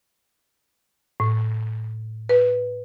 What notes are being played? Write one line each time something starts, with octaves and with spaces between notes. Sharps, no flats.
A2
B4